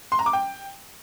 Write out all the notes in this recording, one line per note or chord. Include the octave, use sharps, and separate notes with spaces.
C6
A#5
D6
G5